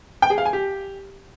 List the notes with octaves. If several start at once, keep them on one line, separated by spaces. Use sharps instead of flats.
G5
G#4
F5
G#5
G4